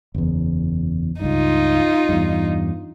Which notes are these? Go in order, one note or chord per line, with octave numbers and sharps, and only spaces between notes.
F#1 E2
C#2 G2 D#4 F4
E2 G2